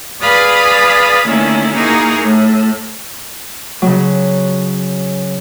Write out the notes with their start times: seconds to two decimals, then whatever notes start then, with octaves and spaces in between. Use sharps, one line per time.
0.21 G#4 B4 D5 F5 B5 D#6
1.26 D3 D#3 A3 A#3 C#4 E4
1.74 A#3 D#4 E4 F#4 G#4 A#4
2.21 A2
3.82 C#3 F#3